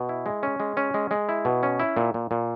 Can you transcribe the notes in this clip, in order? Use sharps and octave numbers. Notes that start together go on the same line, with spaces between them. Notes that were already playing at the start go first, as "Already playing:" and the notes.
Already playing: B2
E4
G#3
C#4
G#3
C#4
G#3
G#3
E4
B2
C#4
E4
A#2
A#2
A#2